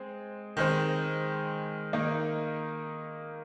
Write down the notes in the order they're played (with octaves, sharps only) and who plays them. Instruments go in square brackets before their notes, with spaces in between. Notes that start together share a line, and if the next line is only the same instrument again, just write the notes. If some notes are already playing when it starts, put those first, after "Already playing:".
Already playing: [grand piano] G#3 C4
D#3 G#3 C4
D#3 A#3 D#4